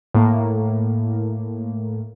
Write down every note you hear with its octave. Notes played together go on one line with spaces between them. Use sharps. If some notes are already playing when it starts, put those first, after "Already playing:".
A2 A#3